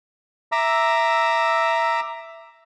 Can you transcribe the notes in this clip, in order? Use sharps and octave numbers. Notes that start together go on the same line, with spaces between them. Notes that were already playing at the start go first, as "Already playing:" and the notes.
E5 A#5 D6 E6